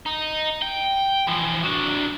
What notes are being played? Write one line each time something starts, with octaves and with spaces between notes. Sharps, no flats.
D#4
G5
E3 F3
F#3 D4